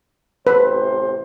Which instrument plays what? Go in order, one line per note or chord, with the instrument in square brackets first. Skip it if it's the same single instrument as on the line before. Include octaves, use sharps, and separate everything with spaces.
[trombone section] A1 C3 C5 [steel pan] B4